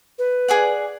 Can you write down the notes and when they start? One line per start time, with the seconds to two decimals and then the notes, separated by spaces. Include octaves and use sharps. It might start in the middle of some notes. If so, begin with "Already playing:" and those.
0.18 B4
0.48 G#4 D5 F#5